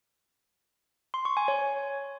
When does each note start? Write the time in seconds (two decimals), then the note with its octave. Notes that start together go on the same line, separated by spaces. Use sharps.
1.14 C6
1.25 C#6
1.37 G#5
1.48 C#5